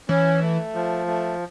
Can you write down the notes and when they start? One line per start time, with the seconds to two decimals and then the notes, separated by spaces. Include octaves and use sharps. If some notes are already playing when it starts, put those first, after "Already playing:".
0.09 E3 C#4
0.41 A3
0.74 F3
1.07 A3